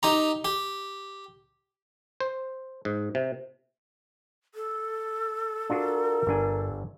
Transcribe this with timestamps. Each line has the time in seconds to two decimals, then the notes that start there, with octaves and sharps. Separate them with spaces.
0.03 D#4 G4 A#5
0.45 G4
2.21 C5
2.85 G#2
3.15 C3
4.55 A4
5.70 D4 F4 F#4 A#4
6.27 G1 G2 D4 G#5